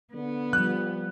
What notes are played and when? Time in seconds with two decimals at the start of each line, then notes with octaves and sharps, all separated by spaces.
0.15 D3 B3
0.53 F3 G3 F#6